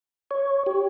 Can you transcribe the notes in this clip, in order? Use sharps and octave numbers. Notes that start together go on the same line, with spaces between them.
C#5
G4